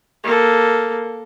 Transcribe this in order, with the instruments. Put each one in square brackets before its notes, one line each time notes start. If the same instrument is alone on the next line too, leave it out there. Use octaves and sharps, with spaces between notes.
[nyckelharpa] A#3 A4